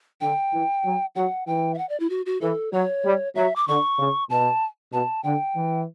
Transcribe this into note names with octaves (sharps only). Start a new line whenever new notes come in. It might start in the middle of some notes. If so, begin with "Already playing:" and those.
D3 G5
E3
F#3
F#3 F#5
E3 G5
E5
F#5
D5
E4
F#4
F#4
E3 A4
F#3 C#5
G3
F#3 E5
D6
D3 C#6
C#3
B2 A5
B2 A5
D3 G5
E3